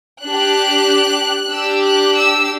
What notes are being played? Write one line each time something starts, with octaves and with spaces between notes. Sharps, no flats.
D4 G4 F#6
D4 G4 E6
F#6
E6